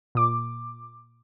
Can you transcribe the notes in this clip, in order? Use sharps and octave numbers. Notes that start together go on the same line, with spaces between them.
A#2 D6